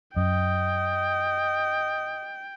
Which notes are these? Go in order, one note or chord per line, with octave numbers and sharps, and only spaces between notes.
F#2 D#5 G5